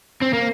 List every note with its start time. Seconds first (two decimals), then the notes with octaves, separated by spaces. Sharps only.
0.21 C4
0.33 A#3